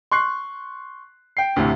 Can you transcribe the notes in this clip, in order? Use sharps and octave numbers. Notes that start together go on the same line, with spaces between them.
C6 C#6 F#6 C7
G5 C7
D2 A2 C3